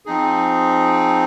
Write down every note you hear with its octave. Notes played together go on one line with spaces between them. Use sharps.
F3 C4 D#4 G#4